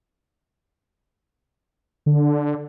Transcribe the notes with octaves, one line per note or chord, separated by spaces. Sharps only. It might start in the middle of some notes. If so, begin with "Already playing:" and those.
D3